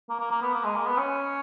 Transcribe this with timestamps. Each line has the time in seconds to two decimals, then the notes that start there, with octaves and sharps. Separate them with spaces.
0.10 A#3
0.20 A#3
0.31 A#3
0.42 B3
0.54 A#3
0.64 G#3
0.76 A#3
0.86 B3
0.97 C#4